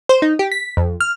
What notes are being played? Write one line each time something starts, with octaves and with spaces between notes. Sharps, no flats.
C5
D#4
G4
B6
F2
F6